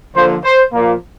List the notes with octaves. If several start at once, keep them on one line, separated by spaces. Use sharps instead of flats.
D3 F3 A#3 C5
C5
A#2 F3 A#3